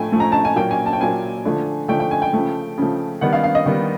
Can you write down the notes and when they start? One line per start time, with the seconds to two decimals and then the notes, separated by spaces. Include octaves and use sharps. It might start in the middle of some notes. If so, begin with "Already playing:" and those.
Already playing: A2 F3 A3 G5 G#5
0.12 A2 F3 A3
0.20 A#5
0.32 A5
0.45 G#5
0.56 A#2 F#3 A#3 G5
0.71 G#5
0.86 A5
0.93 G5
1.00 A#2 F#3 A#3 G#5
1.45 D3 F3 A3
1.88 D3 F3 A3 G5
2.00 G5
2.11 G#5
2.22 G5
2.33 C#3 F3 A3
2.77 C#3 F3 A3
3.21 D#3 G3 B3 F#5
3.33 F5
3.43 F5
3.55 D#5
3.66 D#3 G3 B3